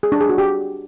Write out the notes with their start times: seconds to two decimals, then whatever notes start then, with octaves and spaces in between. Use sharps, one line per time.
0.03 G#4
0.12 D4
0.21 G#4
0.29 F#4
0.38 G4